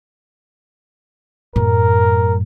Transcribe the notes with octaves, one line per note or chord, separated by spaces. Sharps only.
F#2 A2 A#4